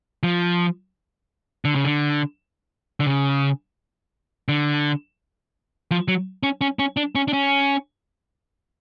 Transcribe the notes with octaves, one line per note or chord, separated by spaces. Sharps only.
F3
D3
C#3
D3
D3
C#3
D3
F3
F#3
C#4
C#4
C#4
D4
C#4
D4
C#4